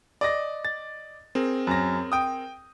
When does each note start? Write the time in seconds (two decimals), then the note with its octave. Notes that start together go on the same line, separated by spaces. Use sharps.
0.21 D5 D#5 A#6
0.65 A6
1.35 C4 G#4 A#4
1.67 F#2 A#6
2.12 G5 D#6